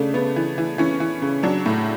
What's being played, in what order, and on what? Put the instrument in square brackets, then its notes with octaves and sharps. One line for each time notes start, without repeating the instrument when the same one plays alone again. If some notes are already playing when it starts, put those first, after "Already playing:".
Already playing: [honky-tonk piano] C#3 A3 D4
C#3 B3
E3
E3
E3 C#4
E3
C#3
F#3 D4
A2